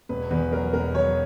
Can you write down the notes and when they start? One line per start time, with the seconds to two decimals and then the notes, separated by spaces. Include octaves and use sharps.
0.09 E1 B4
0.30 E2 B4
0.52 F#3 A#4
0.73 E1 A#4
0.95 F#3 C#5